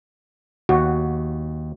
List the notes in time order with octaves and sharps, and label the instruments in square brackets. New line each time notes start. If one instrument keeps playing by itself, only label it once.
[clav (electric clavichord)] D#2 [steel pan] F#4